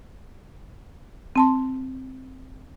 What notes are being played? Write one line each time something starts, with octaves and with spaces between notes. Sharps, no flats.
C4 A5 C6